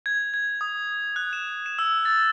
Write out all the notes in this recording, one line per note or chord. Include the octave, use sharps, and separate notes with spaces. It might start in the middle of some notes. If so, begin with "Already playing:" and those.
G#6
G#6
D#6
F#6
E7
E7
E6
A6